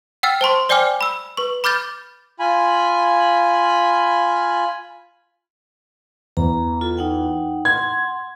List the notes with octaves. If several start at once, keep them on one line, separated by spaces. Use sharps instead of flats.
F#5 G5 E6 F6 A6
C5 A5 C6 C#6
C5 D5 G5 G#5 D6 F6
B5 E6
B4 C#6
B5 D6 F6 G6 A6
F4 G#5 B5
E2 A#5
F4 A4
D#4 F#5 G5
F#5 C6 G#6